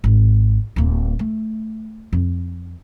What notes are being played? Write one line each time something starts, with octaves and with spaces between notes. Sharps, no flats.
G#1
D1 A#3
A3
F2